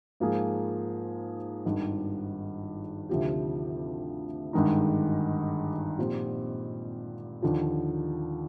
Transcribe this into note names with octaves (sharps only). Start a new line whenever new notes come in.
G#2 F3 A#3 F4 G#4
G#1 G2 D#3
D2 C3 F3 C4 G4
G#1 G2 D#3 G#3 D#4
A#2 F3 C4 G4 C5
D#2 D3 F3